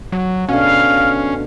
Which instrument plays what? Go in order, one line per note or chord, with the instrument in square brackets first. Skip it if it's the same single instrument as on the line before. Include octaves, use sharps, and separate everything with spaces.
[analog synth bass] F#3
[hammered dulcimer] B2 D3 [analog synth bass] C#4 [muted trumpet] F5